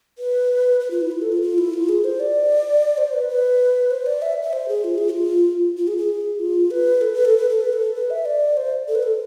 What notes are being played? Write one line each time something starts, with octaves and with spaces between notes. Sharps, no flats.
B4
B4
F4
E4
F4
A4
F4
F4
E4
F4
G#4
C5
D5
C5
B4
B4
C5
D5
E5
E5
C5
G#4
F4
G#4
F4
F4
G#4
G#4
F4
B4
A4
B4
A4
B4
A4
B4
A4
B4
E5
D5
C5
A4
B4
A4